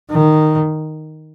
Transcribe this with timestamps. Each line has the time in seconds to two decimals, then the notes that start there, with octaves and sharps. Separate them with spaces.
0.10 D#3